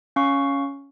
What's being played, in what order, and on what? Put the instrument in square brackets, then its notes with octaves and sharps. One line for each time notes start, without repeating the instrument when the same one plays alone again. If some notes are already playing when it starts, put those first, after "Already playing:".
[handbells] C#4 F5 C#6